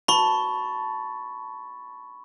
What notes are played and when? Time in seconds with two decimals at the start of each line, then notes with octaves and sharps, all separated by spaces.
0.08 A5 B5 C#6